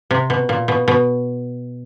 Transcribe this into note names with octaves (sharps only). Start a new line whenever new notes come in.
C3
B2
A#2
B2
B2